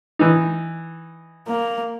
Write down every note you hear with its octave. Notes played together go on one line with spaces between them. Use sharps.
E3 D#4
A#3